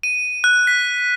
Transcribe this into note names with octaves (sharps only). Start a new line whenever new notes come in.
D#7
F#6
B6